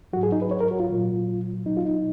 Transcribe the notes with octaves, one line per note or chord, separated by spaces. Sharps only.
G#2 F#3 F#4
G#4
D#4
B4
C#5
A#4
F#4
F4
A#2 F#3
B2 F#3 D#4
F4
D#4